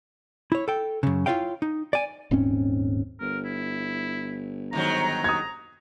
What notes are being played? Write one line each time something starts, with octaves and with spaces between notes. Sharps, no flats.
E4 C#5
A4 G5
F#2 C#3
E4 F4 C#5 F5 G5
D#4
D5 G#5
D#1 G#2 C4 C#4
G1 A#4
E4
G#2 D#3 F#3 A#5
D#6 G#6